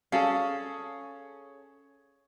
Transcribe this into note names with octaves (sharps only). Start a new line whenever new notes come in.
C#4 G#4 A4 F5